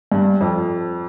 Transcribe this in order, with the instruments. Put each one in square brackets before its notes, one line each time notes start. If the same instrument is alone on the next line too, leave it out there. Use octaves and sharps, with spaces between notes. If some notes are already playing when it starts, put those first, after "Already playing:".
[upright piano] G2
F2